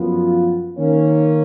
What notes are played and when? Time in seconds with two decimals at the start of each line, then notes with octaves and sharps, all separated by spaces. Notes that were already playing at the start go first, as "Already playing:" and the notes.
Already playing: F#2 F3 B3 F4
0.76 D#3 A#3 C#4